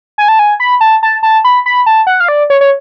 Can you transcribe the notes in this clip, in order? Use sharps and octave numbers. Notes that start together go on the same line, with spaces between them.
G#5
A5
G#5
B5
A5
A5
A5
B5
B5
A5
F#5
F5
D5
C#5
C#5